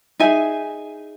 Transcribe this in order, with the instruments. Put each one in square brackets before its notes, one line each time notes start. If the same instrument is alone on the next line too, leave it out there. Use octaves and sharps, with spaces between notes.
[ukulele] D#4 G#4 E5 G#5